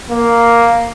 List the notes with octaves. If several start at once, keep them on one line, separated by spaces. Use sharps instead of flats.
A#3